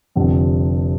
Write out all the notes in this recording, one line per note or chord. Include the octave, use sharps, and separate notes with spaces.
F1 F2 D3 G3